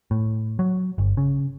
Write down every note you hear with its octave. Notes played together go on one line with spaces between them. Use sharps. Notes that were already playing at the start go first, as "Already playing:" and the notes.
A2
F#3
G1
C#3